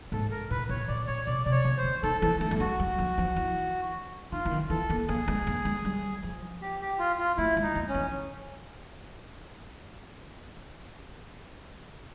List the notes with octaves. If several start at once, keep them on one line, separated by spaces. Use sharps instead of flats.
G#2 A4
A#4
A2 B4
A2 C#5
A#2 D5
A#2 C#5
B2 D5
C3 D5
C#5
C#3
C5
D3
D#3 A4
E3 A4
A3 A4
A3
G#3 F#4
G3
F3
F3
E3
D#3 F4
E3
D#3
E3 A4
A#3
A#3 G#4
G#3
A#3
G#3
G3
F3
G4
G4
F4
F4
A3 E4
G#3
D#4
A3
C#4
E3